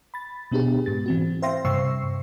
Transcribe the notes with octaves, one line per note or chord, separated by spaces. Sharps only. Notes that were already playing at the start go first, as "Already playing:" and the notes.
B5 A6
B2 B3 D4 G4 G#4
G#2 A6
E3 C4 F#4
C5 E5 F5 G5 C6 A#6
G2 C3 C5 C#6 E6 C7